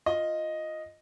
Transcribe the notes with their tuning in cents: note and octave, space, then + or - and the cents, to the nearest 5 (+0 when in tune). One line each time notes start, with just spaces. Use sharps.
F4 +0 D#5 +0